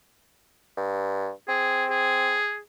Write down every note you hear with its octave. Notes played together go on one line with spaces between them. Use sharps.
G2
C4 G#4
G#4